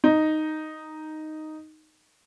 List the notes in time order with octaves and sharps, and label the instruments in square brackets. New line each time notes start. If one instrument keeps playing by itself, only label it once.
[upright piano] D#4